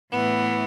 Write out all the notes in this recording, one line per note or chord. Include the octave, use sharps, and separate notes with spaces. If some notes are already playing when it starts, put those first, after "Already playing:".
A2 E3 B3